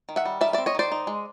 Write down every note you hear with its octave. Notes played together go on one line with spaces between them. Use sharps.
D#3
E5 F#5
G3
D#3 D5 E5
C4 D5 E5
C#5 D#5
D#3 C5 D5
D#4
G#3